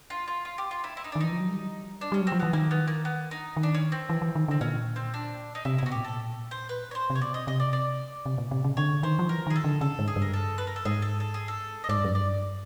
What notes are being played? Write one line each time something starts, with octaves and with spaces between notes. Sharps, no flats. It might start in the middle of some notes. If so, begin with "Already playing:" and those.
F4
F4
F4
G4
F4
E4
E4
D#4
D4
D#3
E3 D#4
F3
F#3
G3
D4
G3 C#4
F#3
C4
F3
E3 B3
D#3 A#3
B3
A#3
B3
D#4
D#3
D4
C#4
C4
E3
E3
D#3
D3 C4
A#2 C#4
C4
D4
D#4
C3 E4
E4
B2 F#4
A2 G4
A#2 A4
C5
B4
C#5
C5
C3
C#5
B2 D5
D#5
C3 D#5
D5
D5
C3
A#2
C3
C#3
D3 C#5
D#3 C5
F3
E3 A#4
D#3 G#4
A4
D3
C#3 A4
G#2
G#4
G2
A#4
A4
B4
A#4
A4
G#2 G#4
A4
A4
G#4
A4
D#5
G#2 D5
G2
F#2
G2 D5